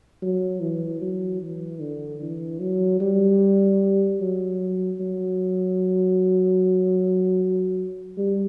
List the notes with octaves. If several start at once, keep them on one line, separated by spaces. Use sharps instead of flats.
F#3
E3
F#3
E3
D3
E3
F#3
G3
F#3
F#3
G3